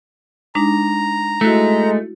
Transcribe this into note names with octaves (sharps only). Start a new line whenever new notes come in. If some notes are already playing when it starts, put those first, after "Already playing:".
G#3 D4 D#4 A#5
G#3 A3 E4 F#4